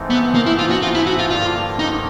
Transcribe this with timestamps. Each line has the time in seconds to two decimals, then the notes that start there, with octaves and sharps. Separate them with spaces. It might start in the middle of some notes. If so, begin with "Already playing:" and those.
Already playing: G#2 E3 A3 C4 D#4
0.10 B3
0.35 A#3
0.46 E4
0.59 F4
0.71 F#4
0.82 F4
0.95 E4
1.07 F#4
1.19 F4
1.30 G2 D3 F3 A#3 F4
1.79 D#4